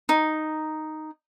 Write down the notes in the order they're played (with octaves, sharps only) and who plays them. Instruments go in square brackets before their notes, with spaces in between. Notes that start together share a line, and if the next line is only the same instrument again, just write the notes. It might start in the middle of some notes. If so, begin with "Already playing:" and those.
[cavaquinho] D#4